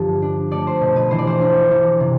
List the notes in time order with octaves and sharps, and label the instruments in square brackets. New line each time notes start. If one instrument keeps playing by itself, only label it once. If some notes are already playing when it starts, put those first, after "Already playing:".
Already playing: [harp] G2 D3 F3
D4
A3 D5
C5
B2
B4
E3 C5
D5
C5
D4
E3
C3